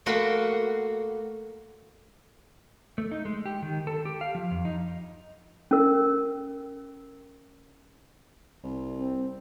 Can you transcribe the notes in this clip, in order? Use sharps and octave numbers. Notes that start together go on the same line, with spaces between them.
A3 A#3 F#4 B5 C6
A3
D#4
G#3
G4
D#3
A4
G4
F5
F3
F2
D#4
C#4 A#4
C2
C4